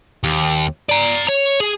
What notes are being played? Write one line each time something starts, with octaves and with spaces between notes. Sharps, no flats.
D#2
D5 A#5
C#5
G#4